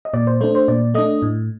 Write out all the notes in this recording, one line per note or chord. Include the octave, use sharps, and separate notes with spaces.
D#5
A#2 D5
C5
A3 D4 C5
C5
A#2 D5
A3 D4 D#5
A2